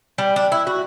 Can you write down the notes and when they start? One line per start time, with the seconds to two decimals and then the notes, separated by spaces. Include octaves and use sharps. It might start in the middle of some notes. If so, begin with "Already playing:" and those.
0.18 G3
0.36 D4
0.52 E4
0.67 F#4